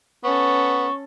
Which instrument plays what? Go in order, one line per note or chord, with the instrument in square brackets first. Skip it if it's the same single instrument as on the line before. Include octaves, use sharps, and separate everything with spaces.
[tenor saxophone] B3 [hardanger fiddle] C#4 A4 [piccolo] C#6